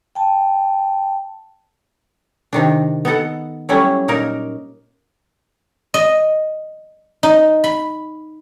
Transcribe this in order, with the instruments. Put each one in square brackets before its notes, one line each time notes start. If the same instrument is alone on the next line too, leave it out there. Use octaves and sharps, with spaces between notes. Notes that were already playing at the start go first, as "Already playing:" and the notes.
[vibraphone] G5 A5
[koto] C3 D#3 D4
B3 D#4 A4 F#5
F#3 G3 A3 C#4 E4
A#2 A#3 D#4 A#4
[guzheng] D#5
D#4
B5